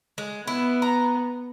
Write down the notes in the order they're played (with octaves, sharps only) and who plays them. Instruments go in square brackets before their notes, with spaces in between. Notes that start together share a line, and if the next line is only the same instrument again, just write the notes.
[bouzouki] G#3
[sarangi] B3 [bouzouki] E4
[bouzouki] A#5